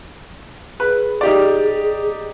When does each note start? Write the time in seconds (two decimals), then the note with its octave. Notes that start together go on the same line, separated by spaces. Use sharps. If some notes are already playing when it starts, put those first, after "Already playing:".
0.80 G#4 B4
1.21 D#4 G4 D5